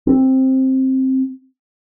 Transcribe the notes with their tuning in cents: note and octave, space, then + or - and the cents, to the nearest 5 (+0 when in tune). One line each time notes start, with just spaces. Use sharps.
C4 +10